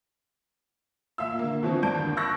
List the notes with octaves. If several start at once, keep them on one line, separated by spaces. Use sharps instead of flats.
A#2 E5 F5 E6
D3 A#3
B2 D3 E3 F3 C4
G2 D5 A5 G6 D7
D#2 D3
C#6 E6 F#6 A#6